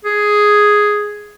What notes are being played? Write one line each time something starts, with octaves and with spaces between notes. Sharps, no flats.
G#4